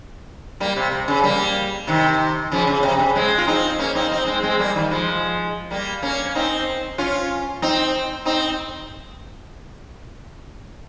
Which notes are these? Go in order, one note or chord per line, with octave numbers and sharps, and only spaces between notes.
G3 A#3
C3
C3
C#3
G3 A#3
C3 D#3
C#3 F3
C#3
C3
C#3
G#3 C4
F4
C4 D#4
A#3 C#4
C4 D#4
C4 D#4
G#3 C4
G#3 C4
G3 A#3
D#3 G3
F3 G#3
G3 A#3
A#3 C#4
C#4
C4 D#4
C#4 F4
C4 D#4
C4 D#4